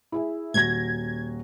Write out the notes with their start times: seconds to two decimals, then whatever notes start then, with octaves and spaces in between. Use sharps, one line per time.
0.12 E4 G#4 E5
0.54 D#1 F#4 G#6 A#6